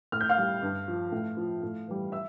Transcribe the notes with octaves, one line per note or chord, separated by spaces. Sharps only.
A2 F6
G6
F5 F6
G3
G2
F3
A2
F3
A2
E3 G3
E5 E6